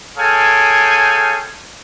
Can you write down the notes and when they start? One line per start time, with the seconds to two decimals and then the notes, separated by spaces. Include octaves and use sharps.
0.18 G#4 A4 C#5 F5 G5 G#5